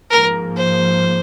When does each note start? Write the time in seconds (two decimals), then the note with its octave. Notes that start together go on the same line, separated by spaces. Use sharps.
0.10 G#2 F3 A#3 A#4
0.57 C5